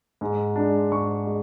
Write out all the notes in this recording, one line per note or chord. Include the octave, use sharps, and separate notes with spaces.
G#2
G#3 D4
G#2 C#6
G#3